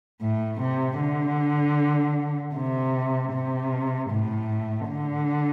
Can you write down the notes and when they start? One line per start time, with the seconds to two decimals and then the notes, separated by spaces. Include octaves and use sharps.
0.22 A2
0.60 C3
0.99 D3
2.55 C3
3.32 C3
4.10 A2
4.87 D3